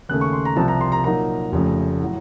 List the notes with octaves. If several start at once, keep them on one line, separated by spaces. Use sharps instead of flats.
D#2 C#3 A3 F#6
C#6
C6
A#5
C2 C3 F3 C4 A5
A#5
C6
A#5
A#2 F#3 A#3 D#4 A#5
F1 F2 C#3 A3
A2 F#3